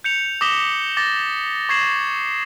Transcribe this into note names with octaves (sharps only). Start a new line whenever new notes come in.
G6 C#7 F7
D6 D#6 A#6 B6 E7 G7
D6 A6 A#6
C#6 G#6 C7 E7 F#7